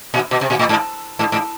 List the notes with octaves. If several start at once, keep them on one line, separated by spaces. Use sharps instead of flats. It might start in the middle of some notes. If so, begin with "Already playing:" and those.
A#2
B2
C3
A#2
A2
G#2
G#2
G#2